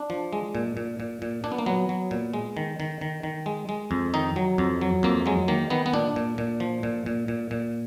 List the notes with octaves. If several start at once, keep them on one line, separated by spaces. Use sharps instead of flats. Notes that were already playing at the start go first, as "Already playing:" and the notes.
Already playing: D4
F3
G#3
A#2
A#2
A#2
A#2
A#2 D4
B3
A#3
F#3 B3
F#3
A#2
G#3
D#3
D#3
D#3
D#3
G#3
G#3
F2
D#3 D#4
F#3
F2
F#3
F2 A#3
F#3 G#3
D#3 A#3
D#3 B3
B3
A#2 D4
A#2
A#2
F3
A#2
A#2
A#2
A#2